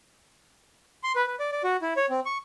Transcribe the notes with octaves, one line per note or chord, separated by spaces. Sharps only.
C6
B4
B4
D5
D5
F#4
E4
C#5
C4
C#6